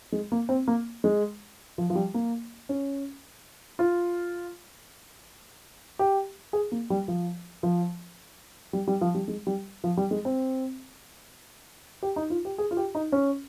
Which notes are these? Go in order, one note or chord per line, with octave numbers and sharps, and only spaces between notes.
G#3
A#3
C4
A#3
G#3
F3
F3
G3
A#3
C#4
F4
G4
G#4
A#3
G3
F3
F3
G3
G3
F3
G3
G#3
G3
F3
G3
G#3
C4
G4
D#4
F4
G4
G#4
F4
G4
D#4
C#4